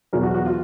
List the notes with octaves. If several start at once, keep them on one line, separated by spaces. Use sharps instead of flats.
E2 B2 F#3 A#4
F#4
F#4
F4